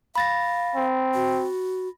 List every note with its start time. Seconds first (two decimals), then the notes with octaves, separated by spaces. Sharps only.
0.16 F5 B5 A6 A#6
0.76 C4
1.14 F#4